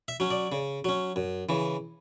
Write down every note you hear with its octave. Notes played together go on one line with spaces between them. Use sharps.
E5
F#3 C#4
D5
C#3
F#3 C#4
F#2
C#3 E3